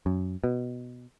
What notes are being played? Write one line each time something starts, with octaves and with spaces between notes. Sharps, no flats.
F#2
B2